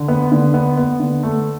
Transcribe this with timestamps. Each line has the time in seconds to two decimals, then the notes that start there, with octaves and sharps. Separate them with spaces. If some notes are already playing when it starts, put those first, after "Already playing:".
Already playing: D3
0.08 B3
0.32 D3
0.54 B3
0.77 B3
1.00 D3
1.23 A3